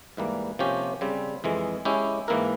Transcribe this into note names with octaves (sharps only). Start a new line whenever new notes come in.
G#2 E3 G3 A#3
C3 F3 A#3 C#4 G4
C#3 G3 C4
F2 E3 G#3
G#3 C#4 E4 G4
G#2 E3 A#3 E4 A#4